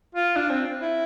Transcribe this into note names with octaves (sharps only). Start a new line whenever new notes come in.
F4
D4
C4
E4